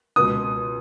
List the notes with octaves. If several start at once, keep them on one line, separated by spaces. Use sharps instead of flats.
C#2 B2 D#6